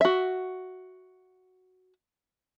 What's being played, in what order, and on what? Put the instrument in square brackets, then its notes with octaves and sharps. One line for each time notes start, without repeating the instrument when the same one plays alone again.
[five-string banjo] F#4 E5